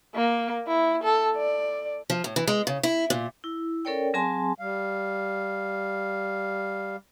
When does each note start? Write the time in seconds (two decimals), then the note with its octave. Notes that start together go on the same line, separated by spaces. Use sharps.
0.15 A#3
0.68 E4
1.04 A4
1.37 D5
2.10 F3
2.24 A2
2.36 E3
2.47 G#3
2.67 C#3
2.83 E4
3.10 A#2
3.44 E4
3.85 C#4 A4 A#4 C#5 D5 G5
4.14 F#3 C4 G#4 G#5 A5 C6
4.59 G3 F5